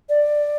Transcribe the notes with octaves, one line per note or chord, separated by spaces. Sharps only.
D5